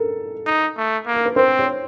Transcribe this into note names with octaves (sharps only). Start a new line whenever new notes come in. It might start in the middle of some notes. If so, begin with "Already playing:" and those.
Already playing: A4 A#4
D#4
A3
A#3
A#4
B4
C4 C5
C#5